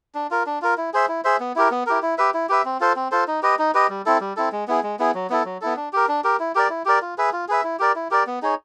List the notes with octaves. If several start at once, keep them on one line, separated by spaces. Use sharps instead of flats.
D4
F4 A#4
D4
F4 A#4
E4
G#4 C5 E5
E4
G#4 C5 E5
B3
E4 G4 A#4
B3
E4 G4 A#4
E4
G4 B4 E5
E4
G4 B4 E5
C4
F4 A4 C5
C4
F4 A4 C5
D#4
G4 B4 D#5
D#4
G4 B4 D#5
G3
C4 E4 A4
G3
C4 E4 A4
G#3
B3 E4 G#4
G#3
B3 E4 G#4
F#3
B3 E4 A4
F#3
B3 E4 A4
D4
G4 A#4
D4
G4 A#4
E4
G4 A#4 D5
E4
G4 A#4 D5
F4
G#4 B4 E5
F4
G#4 B4 E5
E4
G4 A#4 D5
E4
G4 A#4 D5
B3
D#4 G#4 C#5